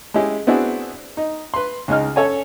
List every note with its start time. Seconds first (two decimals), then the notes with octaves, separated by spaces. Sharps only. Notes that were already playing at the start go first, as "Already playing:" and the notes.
0.14 G#3 C#4 E4 G4 G#4
0.47 B3 C4 D4 E4 F#4 G#4
1.17 D#4
1.54 B4 C6
1.88 C#2 G#3 D#4 F6
2.16 C#4 A4 C#5 G#5